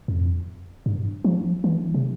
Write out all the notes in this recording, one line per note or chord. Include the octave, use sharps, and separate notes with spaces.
F2
G2
F3
E3
C3